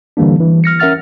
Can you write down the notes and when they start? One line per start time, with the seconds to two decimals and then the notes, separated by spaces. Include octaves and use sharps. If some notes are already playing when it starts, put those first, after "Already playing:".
0.17 D3 E3 G3 A#3 D4
0.40 E3
0.64 F6 A#6 C#7
0.80 C#4 A#4 E5 F#5 F6 A6